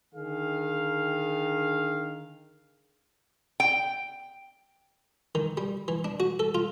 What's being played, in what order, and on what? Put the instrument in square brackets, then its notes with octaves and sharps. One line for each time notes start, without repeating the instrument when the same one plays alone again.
[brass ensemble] D3 D#3 G#4 F5
[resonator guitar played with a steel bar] G5
[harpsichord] D#3
G3
E3
D4
F#4
A4
F4